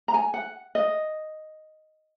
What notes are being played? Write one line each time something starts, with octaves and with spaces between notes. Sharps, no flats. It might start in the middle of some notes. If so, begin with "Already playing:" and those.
A#5
G#5
F#5
D#5